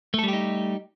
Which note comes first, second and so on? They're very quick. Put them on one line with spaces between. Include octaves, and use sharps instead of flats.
A3 A4 G3 G4 D#4